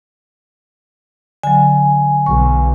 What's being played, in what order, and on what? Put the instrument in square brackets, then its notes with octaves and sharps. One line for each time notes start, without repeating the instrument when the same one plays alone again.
[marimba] D3 F#3 [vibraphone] G#5
[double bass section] B1 [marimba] C#6